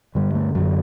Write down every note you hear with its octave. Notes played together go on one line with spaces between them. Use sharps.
G2 D3 G3
A3
F#2 D3 F#3